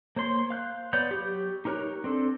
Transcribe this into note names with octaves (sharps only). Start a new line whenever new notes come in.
A#3 C5 C#5 C6
F5 F#6 G6
B3 C#5 D5 G6
F#3 G4
D#4 G4 A#4 C#5 F#6
C4 D4 A4